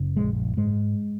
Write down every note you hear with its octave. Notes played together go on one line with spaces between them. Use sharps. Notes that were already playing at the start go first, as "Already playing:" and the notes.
Already playing: F#1 C#3
A#1 G#3
G#2 G#3